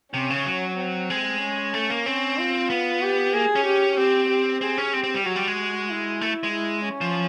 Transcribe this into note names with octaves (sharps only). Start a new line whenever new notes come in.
C3 C#4
C#3
F#3
C4
G#3
C#4
A3
A#3
C4 C#4
F4
B3
G4
A#3 G#4
C#4
G4
C4 G4
G4
C4 G#4
C#4
C4 G4
C4
G3
F#3 F#4
G3
G#3
E4
A3
G#3
E4
C#4
F3